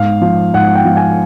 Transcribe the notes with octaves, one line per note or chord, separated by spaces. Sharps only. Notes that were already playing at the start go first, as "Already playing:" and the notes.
Already playing: G#2 F5
F3
G#2 F#5
G5
F3
G#5